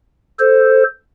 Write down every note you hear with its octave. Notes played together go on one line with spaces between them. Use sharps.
A4 C5